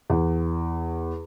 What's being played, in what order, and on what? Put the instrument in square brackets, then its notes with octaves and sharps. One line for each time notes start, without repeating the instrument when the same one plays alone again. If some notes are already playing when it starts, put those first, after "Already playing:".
[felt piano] E2